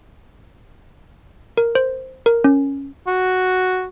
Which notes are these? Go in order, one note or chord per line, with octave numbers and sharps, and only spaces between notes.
A#4
C5
A#4
C#4
F#4